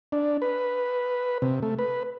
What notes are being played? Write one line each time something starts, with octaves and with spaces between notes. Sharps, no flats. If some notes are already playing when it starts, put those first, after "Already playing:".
D4
B4
C3
A3
B4